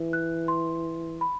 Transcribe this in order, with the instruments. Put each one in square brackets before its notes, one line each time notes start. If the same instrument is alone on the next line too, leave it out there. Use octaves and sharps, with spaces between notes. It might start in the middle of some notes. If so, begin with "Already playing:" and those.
Already playing: [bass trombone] E3
[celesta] F#6
C6
B5